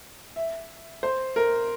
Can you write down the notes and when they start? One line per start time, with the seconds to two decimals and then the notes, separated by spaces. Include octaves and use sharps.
0.36 E5
1.03 C5
1.36 A#4